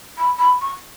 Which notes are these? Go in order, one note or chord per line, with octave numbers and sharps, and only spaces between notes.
B5
B5
C#6